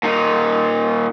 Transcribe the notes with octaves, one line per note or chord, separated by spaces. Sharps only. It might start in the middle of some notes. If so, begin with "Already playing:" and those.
A#2 D#4